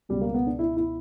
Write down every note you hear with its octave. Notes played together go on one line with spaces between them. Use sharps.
C#2 B2 G3
A#3
B3
D4
E4
E4